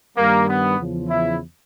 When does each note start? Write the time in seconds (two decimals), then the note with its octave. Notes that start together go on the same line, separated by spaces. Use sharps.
0.17 G2 D#3 G3 A#3
0.49 B3
0.79 E2 C#3 F3
1.10 E4